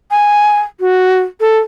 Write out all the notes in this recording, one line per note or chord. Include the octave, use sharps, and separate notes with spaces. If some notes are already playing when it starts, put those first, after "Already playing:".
G#5
F#4
A4